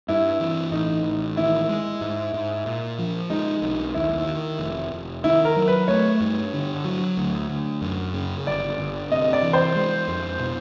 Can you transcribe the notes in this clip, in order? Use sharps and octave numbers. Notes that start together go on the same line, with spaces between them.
G2 E4
E3
A1 D#4
A1
D#3 E4
G#3
G#2
G#2
A#2
F3
G#3 D#4
B1
D#2 E4
D#3
F1
F1
D#3 E4
A#4
F#3
B4
A3 C#5
G2
D3
F#3
D2
D2
F#2
C#3
G1 D5
G1
C3 D#5
D5
E3
C5
G#3
F2
B2